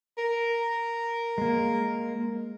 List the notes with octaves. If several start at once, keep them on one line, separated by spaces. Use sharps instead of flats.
A#4
G#3 A#3